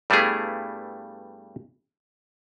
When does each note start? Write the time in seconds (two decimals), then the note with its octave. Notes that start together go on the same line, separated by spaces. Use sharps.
0.10 G2 G3 A3 B3 E4 G#4